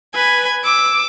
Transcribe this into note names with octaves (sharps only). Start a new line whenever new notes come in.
B4 G#5
D6 E6